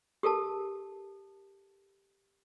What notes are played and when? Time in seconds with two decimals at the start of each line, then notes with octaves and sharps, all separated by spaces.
0.23 G4 A4 A#4 A5